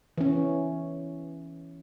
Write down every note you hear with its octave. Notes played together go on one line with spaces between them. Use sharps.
E3 C#4